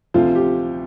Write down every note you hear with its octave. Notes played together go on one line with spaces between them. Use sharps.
D2 C3 F3 F4
G4